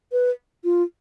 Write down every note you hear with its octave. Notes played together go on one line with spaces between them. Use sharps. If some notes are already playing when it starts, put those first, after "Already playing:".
B4
F4